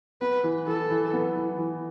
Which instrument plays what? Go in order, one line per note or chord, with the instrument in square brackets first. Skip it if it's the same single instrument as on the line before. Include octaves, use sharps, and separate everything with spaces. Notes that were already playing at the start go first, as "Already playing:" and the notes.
[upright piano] B3 [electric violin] B4
[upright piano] E3
[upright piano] E3 [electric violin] A4
[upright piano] E3
B3
E3
E3